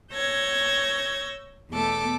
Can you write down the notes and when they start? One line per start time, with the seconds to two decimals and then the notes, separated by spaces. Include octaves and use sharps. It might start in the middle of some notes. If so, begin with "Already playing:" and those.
0.13 C#5 E6 G6 G#6 A#6
1.71 E2 B2 A3 A4 D6